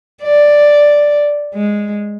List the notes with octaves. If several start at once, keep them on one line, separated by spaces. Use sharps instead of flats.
D5
G#3